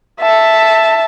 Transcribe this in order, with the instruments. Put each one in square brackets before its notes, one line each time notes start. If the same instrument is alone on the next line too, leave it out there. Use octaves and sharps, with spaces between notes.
[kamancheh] E5 A5